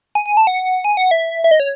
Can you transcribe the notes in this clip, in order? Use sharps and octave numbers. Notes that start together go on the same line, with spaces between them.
G#5
G#5
A5
F#5
G#5
F#5
E5
E5
D#5
C#5